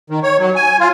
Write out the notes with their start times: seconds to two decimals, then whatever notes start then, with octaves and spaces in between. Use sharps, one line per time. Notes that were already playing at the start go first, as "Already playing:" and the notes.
0.10 D#3
0.23 C#5
0.39 F#3
0.56 G#5
0.80 F4